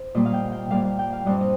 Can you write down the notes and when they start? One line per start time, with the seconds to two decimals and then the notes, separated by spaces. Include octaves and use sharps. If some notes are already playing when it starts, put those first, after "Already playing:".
Already playing: C5
0.15 A#2 G3 A#3 D#5
0.25 F5
0.33 G5
0.52 G5
0.70 A#2 G3 A#3 F5
0.84 F5
0.99 G5
1.13 F5
1.26 G2 G3 C4 D#5
1.41 D#5